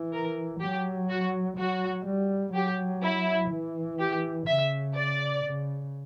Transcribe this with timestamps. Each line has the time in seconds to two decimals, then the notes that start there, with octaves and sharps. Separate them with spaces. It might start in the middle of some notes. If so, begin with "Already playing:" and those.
Already playing: E3
0.13 A#4
0.61 F#3 G4
1.09 F#4
1.58 F#3 F#4
2.06 G3
2.54 F#3 G4
3.03 E4
3.51 E3
3.99 G4
4.47 C#3 E5
4.97 D5
5.44 C#3